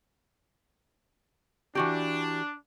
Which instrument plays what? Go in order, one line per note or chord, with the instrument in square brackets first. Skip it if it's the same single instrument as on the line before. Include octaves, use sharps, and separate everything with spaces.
[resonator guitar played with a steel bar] E3 F#4 G4 [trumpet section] D4